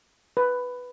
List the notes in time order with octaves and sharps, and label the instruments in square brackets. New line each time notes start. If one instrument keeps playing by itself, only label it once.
[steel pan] B4